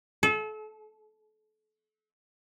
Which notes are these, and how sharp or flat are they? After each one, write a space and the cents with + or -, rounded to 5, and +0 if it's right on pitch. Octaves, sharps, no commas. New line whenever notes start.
A4 -35